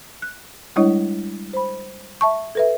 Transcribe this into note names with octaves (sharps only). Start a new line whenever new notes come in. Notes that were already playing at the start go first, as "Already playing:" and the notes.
F#6
G3 G#3 D4 E4 C#5 D#5
C5 B5
E5 A5 C#6
A4 B4 E5